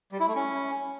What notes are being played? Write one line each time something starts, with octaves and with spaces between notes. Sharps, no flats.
G3
E4
A3
C#4